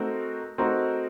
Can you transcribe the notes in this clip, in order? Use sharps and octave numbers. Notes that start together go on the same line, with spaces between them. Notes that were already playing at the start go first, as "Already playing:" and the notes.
Already playing: A3 C4 D#4 F#4 A#4
A3 C4 D#4 F#4 A#4